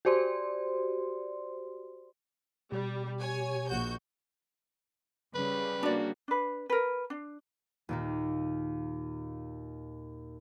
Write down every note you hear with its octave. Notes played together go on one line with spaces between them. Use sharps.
F#4 G4 C5 D5 C6
B2 G3 G4
C#5 G#5
A#1 F#4 G6
C#3 G3 B4
A#3 D4 F#4 D5
D4 B4
A#4 B4
D4
D#2 A#2 A#3